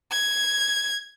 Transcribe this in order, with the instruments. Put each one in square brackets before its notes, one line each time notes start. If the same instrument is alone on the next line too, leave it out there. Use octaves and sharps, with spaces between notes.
[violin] G#6